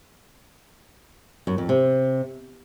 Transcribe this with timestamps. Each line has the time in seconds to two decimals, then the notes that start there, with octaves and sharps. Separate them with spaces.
1.47 F#2
1.58 F2
1.69 C3